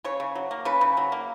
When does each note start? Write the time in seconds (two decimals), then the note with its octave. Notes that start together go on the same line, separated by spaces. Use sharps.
0.04 C#3 C#5
0.20 C#3
0.35 F#3
0.51 A#3
0.65 C#3 B4
0.81 C#3
0.97 F#3
1.12 A#3